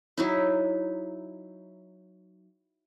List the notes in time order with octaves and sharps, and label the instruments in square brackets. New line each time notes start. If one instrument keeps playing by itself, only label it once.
[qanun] F#3 D#4 E4